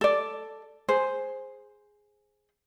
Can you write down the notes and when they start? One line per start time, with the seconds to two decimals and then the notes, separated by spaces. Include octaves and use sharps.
0.01 A4 D5
0.88 G#4 C5